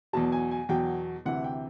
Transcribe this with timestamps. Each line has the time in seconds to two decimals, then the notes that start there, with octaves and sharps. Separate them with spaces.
0.13 E2 B2 F#3 A5
0.32 G#5
0.51 G#5
0.69 E2 B2 F#3 G5
1.25 D2 C3 E3 F#5
1.44 G5